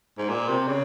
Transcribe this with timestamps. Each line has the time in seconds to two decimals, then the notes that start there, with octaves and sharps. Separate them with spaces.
0.18 G#2
0.30 A#2
0.48 C3
0.68 C#3